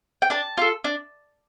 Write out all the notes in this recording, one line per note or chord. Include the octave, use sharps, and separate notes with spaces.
G5
D4 A5
F4 A4
D4